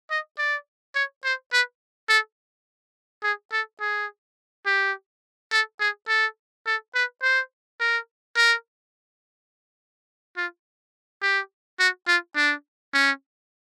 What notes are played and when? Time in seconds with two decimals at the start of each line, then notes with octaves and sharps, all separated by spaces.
0.10 D#5
0.38 D5
0.95 C#5
1.24 C5
1.53 B4
2.09 A4
3.23 G#4
3.52 A4
3.80 G#4
4.66 G4
5.52 A4
5.80 G#4
6.08 A4
6.67 A4
6.95 B4
7.22 C5
7.80 A#4
8.37 A#4
10.37 F4
11.22 G4
11.79 F#4
12.08 F4
12.36 D4
12.94 C#4